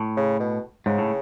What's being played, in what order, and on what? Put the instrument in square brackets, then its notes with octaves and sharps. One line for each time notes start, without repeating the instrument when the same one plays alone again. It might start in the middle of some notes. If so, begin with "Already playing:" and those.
Already playing: [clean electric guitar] A2
[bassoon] C#3
B2
[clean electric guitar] G#2 [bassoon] C#3
[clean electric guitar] A2